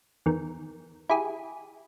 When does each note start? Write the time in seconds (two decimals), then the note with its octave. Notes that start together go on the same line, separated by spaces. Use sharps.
0.26 E2 D#3
1.09 E4 G4 G#4